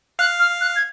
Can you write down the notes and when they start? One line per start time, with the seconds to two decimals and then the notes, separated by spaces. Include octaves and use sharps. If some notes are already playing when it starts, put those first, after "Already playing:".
0.19 F5 F#6
0.39 F6
0.61 F#6
0.76 G#6